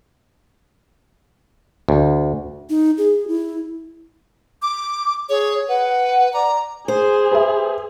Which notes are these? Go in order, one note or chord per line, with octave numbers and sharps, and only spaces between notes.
D2
D#4
G#4
E4
D6
G#4 C#5
B4 F#5
D5 A#5
G#4 C5
B4 E5